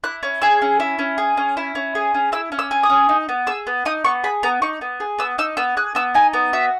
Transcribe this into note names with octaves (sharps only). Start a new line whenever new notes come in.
E4 F#6
C#4
G#4 E6
C#4
E4
C#4
G#4
C#4
E4
C#4
G#4
C#4
E4 E6
C#4
E6
G#4
D#6
C#4
D#4
B3
G#4 E6
B3
D#4 D#6
B3 C#6
G#4 B5
B3 A#5
D#4 C#6
B3
G#4
B3 E6
D#4 E6
B3 E6
G#4 F#6
B3 E6
D#4 G#5
B3
F#4 E5